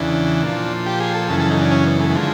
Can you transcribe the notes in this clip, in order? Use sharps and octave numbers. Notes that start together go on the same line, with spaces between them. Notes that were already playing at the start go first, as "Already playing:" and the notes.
Already playing: E2 C#3 E3 D4
A#2 F3
G4
G#4
A4
F#2 C#3 E3 A4
A4
D#4
D4
C#4
B3
A3
A3
D3 F3 G#3